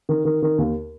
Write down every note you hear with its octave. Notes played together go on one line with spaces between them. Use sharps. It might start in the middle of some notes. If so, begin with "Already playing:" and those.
D#3
D#3
D#3
D#2